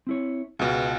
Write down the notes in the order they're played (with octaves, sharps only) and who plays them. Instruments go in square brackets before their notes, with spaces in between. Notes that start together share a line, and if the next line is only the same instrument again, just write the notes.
[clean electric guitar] C4 E4 C#5
[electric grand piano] C#2 B2 [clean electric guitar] G#4